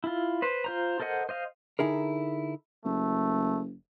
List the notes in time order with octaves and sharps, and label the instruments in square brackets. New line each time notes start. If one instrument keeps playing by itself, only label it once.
[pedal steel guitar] E4 F4
B4 C5
F4 C5 A#5
A4 A#4 C5 D#5 F#5
C5 D#5 F5
[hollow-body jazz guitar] D3 D#4 E4 G#4 A#4
[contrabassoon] F#1 [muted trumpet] A3